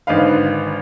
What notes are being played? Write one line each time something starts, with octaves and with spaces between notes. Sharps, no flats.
G#1 D3 D#4 B4 F5